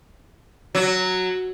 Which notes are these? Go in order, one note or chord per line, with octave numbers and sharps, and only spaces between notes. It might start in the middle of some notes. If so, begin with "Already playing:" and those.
F#3